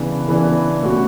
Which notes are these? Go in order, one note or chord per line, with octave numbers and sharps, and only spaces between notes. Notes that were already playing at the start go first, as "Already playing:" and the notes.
Already playing: C#3 E3 B3 D4
C#3 E3 B3 D4
B2 A3 C#4 F#4